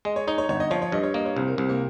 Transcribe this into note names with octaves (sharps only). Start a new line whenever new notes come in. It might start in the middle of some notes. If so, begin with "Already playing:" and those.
G#3 D#5
C#5
D#4 C#5
C#5
G1 C#5
D#5
F3 C#5
C#5
G2 D#5
C#5
A#3 D#5
C#5
C2 C5
A#4
C2 C4
A#3